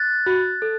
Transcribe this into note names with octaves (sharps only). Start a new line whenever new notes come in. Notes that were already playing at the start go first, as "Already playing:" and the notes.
Already playing: F#6 A6
F#4
A4